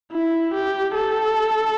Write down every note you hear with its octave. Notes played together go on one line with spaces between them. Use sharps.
E4
G4
A4